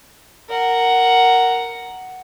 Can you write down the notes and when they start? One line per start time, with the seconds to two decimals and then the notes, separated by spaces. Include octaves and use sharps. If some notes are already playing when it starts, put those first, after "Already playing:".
0.49 A#4 F#5